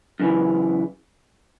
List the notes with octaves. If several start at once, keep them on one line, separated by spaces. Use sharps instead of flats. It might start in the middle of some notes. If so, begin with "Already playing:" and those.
F#2 C#3 E3